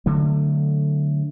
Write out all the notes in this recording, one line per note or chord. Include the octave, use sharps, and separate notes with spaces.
D3 F#3 A3